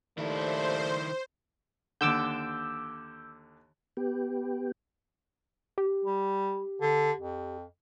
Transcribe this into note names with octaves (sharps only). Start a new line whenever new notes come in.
D#2 D#3 A3 E4 C5 D5
D#2 D3 D6 E6 G6
B3 G4
G4
G3
D3
F2